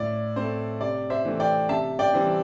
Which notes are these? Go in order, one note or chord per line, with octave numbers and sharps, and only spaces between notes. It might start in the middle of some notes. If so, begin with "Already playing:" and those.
Already playing: A2 D5
A3 C4 C5
C3 D5
C5 E5
E3 A3 C4
D5 G5
C3 E5 A5
D5 G5
E3 G3 C4